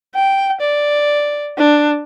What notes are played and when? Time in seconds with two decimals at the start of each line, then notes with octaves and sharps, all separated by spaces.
0.15 G5
0.61 D5
1.58 D4